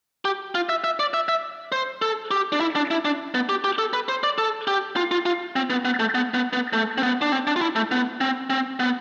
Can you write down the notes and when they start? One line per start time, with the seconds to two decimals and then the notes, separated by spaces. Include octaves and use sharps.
0.25 G4
0.55 F4
0.69 E5
0.84 E5
0.99 D5
1.14 E5
1.29 E5
1.72 C5
2.02 A4
2.31 G4
2.52 D4
2.60 E4
2.76 D4
2.91 E4
3.05 D4
3.34 B3
3.49 G4
3.64 G4
3.78 A4
3.93 B4
4.09 C5
4.24 D5
4.38 A4
4.67 G4
4.97 F4
5.11 F4
5.26 F4
5.56 C4
5.70 B3
5.85 B3
6.00 A3
6.15 B3
6.34 B3
6.53 B3
6.73 A3
6.98 C4
7.03 B3
7.22 D4
7.32 C4
7.47 D4
7.56 F4
7.61 E4
7.76 A3
7.91 B3
8.21 C4
8.50 C4
8.80 B3